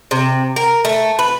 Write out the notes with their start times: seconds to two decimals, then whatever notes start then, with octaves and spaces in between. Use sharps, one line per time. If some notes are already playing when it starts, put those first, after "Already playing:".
0.11 C3
0.56 A#4
0.85 A3
1.19 B4